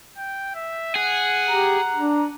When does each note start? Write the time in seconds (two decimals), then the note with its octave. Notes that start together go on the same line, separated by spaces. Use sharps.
0.17 G5
0.55 E5
0.96 G#4 F#5
1.48 G4 A#5
1.94 D4